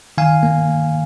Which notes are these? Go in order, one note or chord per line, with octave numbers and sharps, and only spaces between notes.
D#3 F5 G#5
A#3
A#3